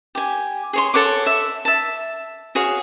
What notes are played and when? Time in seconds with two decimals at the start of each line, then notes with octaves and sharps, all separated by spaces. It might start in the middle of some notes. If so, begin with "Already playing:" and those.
0.15 G4 G#5
0.73 G#4 C#5 C6
0.94 A4 C#5 F#5 D6
1.26 E5
1.65 E5 A5
2.55 F#4 G#4 C#5 F5